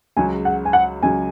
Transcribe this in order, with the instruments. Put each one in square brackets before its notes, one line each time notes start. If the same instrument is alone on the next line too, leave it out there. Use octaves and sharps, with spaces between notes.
[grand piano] C#2 C#3 F#3 [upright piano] G#5
[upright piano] F#5
G#5
F#5
[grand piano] C#2 C#3 F#3 [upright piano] G#5